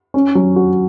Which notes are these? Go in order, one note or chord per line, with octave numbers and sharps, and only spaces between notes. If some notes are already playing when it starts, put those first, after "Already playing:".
C#4
F#3
F#4